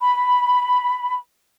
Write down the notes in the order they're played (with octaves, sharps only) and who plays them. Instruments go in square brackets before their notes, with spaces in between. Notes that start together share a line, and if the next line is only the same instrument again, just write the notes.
[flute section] B5